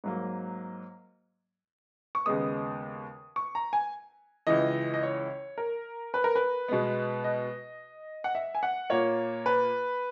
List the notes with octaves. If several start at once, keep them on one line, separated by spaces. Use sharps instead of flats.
G#2 F#3 A#3
C#6
D#2 C#3 G#3 B3 D#6
C#6
A#5
G#5
C#2 C#3 E3 D#5
D#5
C#5
A#4
B4
A#4
B4
B2 G#3 B3
D#5
F#5
E5
G#5
F#5
A#2 A#3 C#5
B4